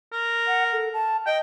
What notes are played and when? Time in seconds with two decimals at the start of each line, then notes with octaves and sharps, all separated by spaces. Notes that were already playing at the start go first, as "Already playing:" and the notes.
0.12 A#4
0.47 F#5
0.72 A4
0.93 A5
1.26 D#5 G5